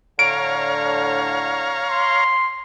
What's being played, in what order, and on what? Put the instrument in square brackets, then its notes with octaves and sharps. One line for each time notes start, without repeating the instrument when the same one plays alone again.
[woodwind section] A2 D3 [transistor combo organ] C#5 F5 A#5 [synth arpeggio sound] D7
[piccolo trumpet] C6